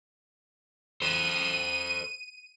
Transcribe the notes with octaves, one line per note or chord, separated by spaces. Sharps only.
A4 C5 D#7